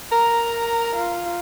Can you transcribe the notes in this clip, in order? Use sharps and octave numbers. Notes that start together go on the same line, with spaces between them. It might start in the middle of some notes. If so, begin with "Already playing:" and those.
A#4 A#5
F4